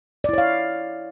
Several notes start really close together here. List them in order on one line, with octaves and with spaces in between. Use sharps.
D5 E4 C#5 F5